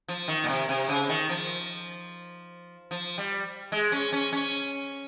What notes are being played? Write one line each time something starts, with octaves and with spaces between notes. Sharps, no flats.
F3
D#3
A#2
C3
C3
C#3
D#3
F3
F3
G3
G#3
C#4
C#4
C#4